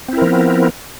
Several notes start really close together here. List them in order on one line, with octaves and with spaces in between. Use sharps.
C4 E4 A#4 F3 B3